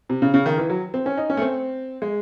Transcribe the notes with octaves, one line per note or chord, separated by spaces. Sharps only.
C3
C#3
C#3
D#3
E3
F#3
C4
C#4
D#4
C#4
A3
C4
G#3